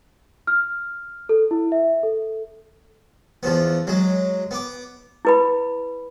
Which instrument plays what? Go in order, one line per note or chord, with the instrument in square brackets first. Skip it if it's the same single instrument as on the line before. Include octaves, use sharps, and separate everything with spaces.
[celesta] F6
A4
E4
E5
A4
[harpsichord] E2 F3 B3
F#3 G#3
B3 D6
[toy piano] E4 B4 B5